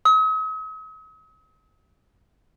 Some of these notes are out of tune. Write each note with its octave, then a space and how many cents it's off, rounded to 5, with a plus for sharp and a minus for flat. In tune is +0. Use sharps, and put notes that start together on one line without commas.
D#6 +45